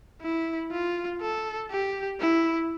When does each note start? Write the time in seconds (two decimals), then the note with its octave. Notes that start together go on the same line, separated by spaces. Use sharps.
0.21 E4
0.71 F4
1.21 A4
1.70 G4
2.20 E4